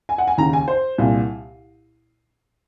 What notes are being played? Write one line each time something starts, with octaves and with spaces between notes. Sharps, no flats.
G#5
F#5
G#5
D#2 C#3 A#5
G#5
C5
C2 A#2